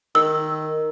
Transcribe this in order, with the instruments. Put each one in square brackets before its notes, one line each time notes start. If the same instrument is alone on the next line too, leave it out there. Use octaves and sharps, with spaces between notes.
[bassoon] D#3 [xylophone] E6